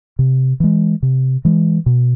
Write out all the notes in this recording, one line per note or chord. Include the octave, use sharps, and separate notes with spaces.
C3
E3 G#3
C3
E3 G#3
B2